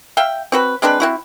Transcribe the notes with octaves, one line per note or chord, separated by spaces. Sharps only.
E5 F5 G5
C4 F#4 B4
G#3 C4 D4 B4
C4 E4 F#4